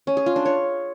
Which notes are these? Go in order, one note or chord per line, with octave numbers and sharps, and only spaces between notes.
C#4
G#4
F4
D4
C#5